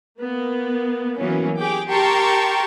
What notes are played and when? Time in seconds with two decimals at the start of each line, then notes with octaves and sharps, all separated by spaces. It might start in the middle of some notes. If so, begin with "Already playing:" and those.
0.20 A#3 B3
1.19 E3 F#3 A#3 B3 C#4
1.60 G4 G#4 G5 D6
1.90 G4 A#4 G5 A5 C6 C#6